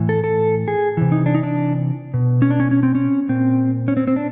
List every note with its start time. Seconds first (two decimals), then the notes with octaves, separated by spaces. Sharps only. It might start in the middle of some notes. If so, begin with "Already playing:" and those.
Already playing: A2 E3
0.09 A4
0.24 A4
0.68 G#4
0.97 C3 E3
1.12 D#4
1.26 D4
1.35 D#4
1.43 D4
2.14 B2
2.42 C#4
2.51 D4
2.60 C#4
2.71 C#4
2.83 C4
2.95 C#4
3.29 A#2 C4
3.88 C#4
3.97 C4
4.07 C4
4.16 D4